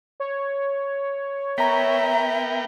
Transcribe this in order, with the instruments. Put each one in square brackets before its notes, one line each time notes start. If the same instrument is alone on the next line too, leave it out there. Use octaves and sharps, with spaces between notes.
[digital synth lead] C#5
[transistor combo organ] B3 A#4 G5 [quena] E5 [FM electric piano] A#5 B6